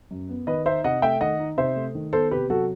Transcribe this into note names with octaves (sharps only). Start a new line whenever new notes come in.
F#2
B3
D#3 B4 D#5
D#4 C5 E5
C3 D#5 F#5
A3 E5 G5
D#3 D#5 F#5
D#4
C3 C5 E5
A3
D#3
B3 A4 C5
C3 G4 B4
F#3 F#4 A4